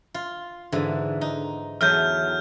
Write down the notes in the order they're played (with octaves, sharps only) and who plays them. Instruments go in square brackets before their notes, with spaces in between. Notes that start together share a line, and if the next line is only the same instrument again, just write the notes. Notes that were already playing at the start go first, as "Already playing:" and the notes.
[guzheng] F4
G#2 D3 E3
D#4
[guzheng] E2 F#3 A3 [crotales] F6 G6